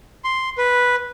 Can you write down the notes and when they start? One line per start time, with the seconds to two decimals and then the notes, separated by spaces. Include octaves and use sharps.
0.24 C6
0.58 B4